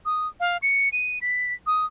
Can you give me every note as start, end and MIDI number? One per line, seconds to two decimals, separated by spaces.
0.06 0.28 87
0.40 0.57 77
0.62 0.89 97
0.93 1.19 99
1.21 1.54 95
1.67 1.86 87